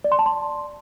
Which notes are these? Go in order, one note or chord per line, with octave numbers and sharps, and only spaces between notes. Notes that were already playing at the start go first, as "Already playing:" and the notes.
D5
C6
A5
C6